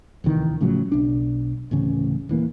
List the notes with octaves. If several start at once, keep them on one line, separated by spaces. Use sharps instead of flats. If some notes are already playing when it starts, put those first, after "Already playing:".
D1 C2 D#3 E3
A2 C#3 F3 F#3
B1 D4
D1 A1 C#3
D#1 E3 A#3